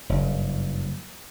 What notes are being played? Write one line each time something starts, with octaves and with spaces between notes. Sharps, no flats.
F#1 G2